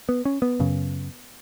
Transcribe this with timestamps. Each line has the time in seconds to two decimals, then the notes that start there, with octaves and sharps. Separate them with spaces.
0.09 B3
0.25 C#4
0.42 B3
0.60 F#2 C#3